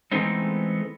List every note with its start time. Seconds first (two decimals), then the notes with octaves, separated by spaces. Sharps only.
0.12 E3 G#3 A3 B3 C4 D#4